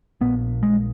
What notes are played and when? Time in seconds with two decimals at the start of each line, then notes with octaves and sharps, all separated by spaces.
0.21 A#1 A#2 B3
0.63 G#3